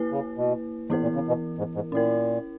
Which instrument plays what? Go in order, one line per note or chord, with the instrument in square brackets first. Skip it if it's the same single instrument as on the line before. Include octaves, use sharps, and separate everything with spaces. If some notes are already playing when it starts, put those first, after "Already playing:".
Already playing: [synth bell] A#3 E4 B4
[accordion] C#3
B2
[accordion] G#2 [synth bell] E3 B3 E4 A#4
[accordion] A#2
C#3
B2
G#2
G#2
[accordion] A#2 [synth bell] C#4 E4 A#4